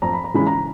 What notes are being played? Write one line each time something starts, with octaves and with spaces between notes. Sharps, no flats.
F2 A#5
B5
A#5
C#3 E3 G#3 C#4 B5
A#5